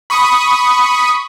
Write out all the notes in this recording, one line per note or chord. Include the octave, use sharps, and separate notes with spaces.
B5 C#6 D#6